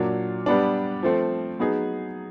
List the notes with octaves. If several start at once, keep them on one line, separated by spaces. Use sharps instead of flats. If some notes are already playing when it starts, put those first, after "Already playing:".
Already playing: A#2 F#3 A#3 D4
G3 B3 D4
F3 A3 C4
F#3 B3 D#4 G#4